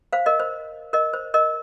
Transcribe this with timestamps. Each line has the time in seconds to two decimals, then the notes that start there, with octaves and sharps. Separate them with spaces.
0.13 C5 F5
0.26 A#4 D#5
0.40 C5
0.93 A#4 D#5
1.14 C5
1.34 A#4 D#5